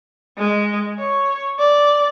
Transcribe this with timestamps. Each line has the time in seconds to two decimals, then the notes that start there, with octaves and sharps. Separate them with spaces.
0.38 G#3
0.99 C#5
1.59 D5